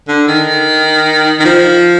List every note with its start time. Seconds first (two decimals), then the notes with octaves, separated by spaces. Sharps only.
0.08 D3
0.28 D#3
1.40 D#3
1.45 F3